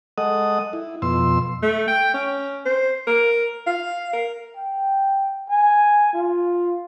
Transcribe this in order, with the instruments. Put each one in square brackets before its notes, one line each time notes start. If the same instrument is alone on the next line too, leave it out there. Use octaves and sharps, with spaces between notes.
[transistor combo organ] G#3 A4 D#5 F#5 D#6
E4
F2 B2 C6 E6
[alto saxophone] A3
G5
C#4
C5
A#4
F5
A#4
[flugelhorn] G5
G#5
F4